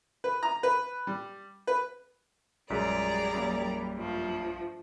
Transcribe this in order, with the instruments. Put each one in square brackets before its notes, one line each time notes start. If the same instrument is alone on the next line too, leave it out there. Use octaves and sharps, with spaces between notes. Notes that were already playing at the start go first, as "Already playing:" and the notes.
[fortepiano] B4
A#5
B4
G3
B4
[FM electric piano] A#1 B6 [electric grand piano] F#2 G#3 [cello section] G3 [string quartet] G#4 D5 A#5
[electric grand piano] F#2 A#3
[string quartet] G2 F3 A3